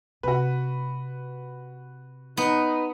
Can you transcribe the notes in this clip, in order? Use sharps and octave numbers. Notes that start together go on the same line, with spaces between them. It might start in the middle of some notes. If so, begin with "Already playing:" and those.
C3 F#4 B4
B3 D#4